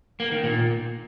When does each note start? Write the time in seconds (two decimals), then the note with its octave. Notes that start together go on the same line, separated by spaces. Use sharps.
0.20 A#3
0.32 D#3
0.43 A#2